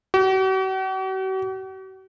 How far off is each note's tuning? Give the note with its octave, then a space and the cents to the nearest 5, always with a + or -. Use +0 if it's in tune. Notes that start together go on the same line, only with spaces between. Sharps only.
F#4 +45